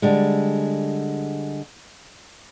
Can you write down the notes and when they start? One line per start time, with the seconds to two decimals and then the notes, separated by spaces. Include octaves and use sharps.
0.02 D3 G3 G#3